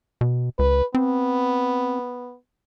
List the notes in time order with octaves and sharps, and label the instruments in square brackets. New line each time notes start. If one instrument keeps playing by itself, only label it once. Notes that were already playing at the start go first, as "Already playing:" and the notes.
[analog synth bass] B2
[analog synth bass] C#2 [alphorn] B4
[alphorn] B3 [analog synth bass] C4